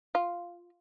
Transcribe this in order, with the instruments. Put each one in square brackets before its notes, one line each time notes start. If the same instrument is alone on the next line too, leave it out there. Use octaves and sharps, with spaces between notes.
[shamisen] F4